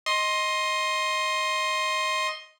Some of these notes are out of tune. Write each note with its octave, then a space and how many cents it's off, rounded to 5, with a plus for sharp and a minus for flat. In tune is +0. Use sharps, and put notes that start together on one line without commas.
D#5 +5 C6 +15